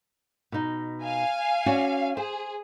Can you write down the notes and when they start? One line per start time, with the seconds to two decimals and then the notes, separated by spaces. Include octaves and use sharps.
0.52 B2 D#4
1.02 F5 G#5
1.66 C#4 F#4 D5
2.17 G#4 C5